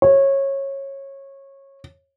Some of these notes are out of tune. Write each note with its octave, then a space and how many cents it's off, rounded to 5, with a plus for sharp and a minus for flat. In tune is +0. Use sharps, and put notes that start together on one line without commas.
C#5 -20